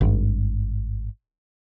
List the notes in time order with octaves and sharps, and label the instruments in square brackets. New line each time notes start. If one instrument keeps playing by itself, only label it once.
[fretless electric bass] G#1 G2